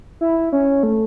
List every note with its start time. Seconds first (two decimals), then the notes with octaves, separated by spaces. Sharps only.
0.21 E4
0.52 C#4
0.83 A3